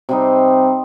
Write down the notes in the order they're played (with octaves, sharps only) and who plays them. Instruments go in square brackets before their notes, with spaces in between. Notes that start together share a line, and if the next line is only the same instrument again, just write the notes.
[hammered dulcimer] C3 G3 C4 D#4